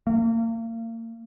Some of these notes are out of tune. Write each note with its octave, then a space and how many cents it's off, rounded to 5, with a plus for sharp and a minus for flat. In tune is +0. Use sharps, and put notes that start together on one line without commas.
A#3 -35